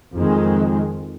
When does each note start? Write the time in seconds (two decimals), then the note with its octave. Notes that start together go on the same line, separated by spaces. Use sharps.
0.16 F2 D#3 G#3